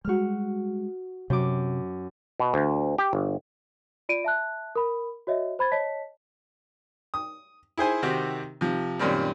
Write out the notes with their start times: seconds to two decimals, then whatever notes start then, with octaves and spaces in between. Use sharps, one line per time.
0.05 G3 G#3 F#4 F6
1.30 F#2 C3 D6
2.40 B2
2.54 D2
2.98 G4
3.13 G1
4.09 F4 D5 D7 D#7
4.24 E5 A5 F#6
4.76 A#4 B5
5.27 F#4 C#5 D#5 E5
5.59 C5 B5 G#6 A6
5.72 C#5 D#5 A5 B6
7.14 D#6
7.78 E4 G#4 C5 G#5
8.03 C3 D#3 C4 F#4 G4
8.61 C3 F3
8.99 F#2 A#2 D#3 G3 C4